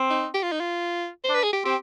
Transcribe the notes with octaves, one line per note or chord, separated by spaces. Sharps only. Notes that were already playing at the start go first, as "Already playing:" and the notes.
Already playing: C4
D#4
G4
F4
D#4
F4
C5
D4 B4
G#4
G4
C4 G4